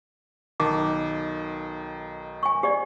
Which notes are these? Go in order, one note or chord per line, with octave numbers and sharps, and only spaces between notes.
B1 D#3 A5 D6
G#5 C#6
G4 D5 D#5